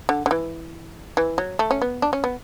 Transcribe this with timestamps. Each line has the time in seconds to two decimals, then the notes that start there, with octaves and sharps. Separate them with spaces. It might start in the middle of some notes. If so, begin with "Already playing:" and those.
0.09 D3
0.26 D3
0.31 E3
1.17 E3
1.38 F#3
1.59 A3
1.71 C#4
1.82 B3
2.02 D4
2.13 C#4
2.24 B3